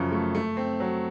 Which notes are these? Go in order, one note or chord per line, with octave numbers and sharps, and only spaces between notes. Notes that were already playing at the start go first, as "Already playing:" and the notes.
Already playing: F#2 C#3 F3
A3
A3
C4
F#3